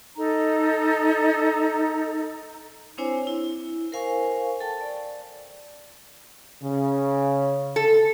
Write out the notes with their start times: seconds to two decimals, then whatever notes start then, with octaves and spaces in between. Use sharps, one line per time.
0.17 D#4 A4 A#5
2.98 C4 D4 E4 C5 C#5 G#5
3.27 E4
3.92 A#4 C5 F5 G#5 C#6
4.60 A4 G5 A5
4.81 D5
6.63 C#3
7.76 A4